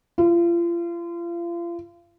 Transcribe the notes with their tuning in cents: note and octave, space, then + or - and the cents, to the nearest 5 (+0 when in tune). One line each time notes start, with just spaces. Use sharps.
F4 -35